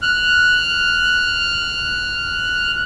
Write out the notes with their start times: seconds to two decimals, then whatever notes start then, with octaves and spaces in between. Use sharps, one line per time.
0.02 F6 F#6